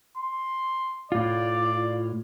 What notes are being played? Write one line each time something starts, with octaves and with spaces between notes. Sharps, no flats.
C6
A2 F4 D5